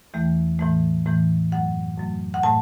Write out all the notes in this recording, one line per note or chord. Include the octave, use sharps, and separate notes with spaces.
E2 E3 A3
A2 E3 A3
A2 E3 A3
F#2 F#3 A3 F#5
F#2 F#3 A3
F#5
A2 A3 A5